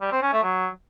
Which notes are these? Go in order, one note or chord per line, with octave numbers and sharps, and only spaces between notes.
G3
C4
C#4
A3
F#3